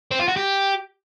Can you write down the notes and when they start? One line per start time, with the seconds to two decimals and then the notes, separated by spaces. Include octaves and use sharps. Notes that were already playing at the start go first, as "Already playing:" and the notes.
0.11 C4
0.20 F4
0.28 F#4
0.36 G4